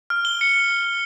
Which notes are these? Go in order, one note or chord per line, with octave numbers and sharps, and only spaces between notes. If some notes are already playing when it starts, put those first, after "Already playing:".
F6
G7
C#7